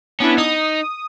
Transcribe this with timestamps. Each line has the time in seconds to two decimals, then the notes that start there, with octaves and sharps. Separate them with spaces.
0.20 B3 C#4 D4 E4
0.38 D#4 D#6